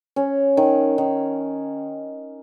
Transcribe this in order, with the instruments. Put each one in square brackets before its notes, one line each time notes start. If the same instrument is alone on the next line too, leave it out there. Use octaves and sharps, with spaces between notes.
[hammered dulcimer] C#4
D#3
D#3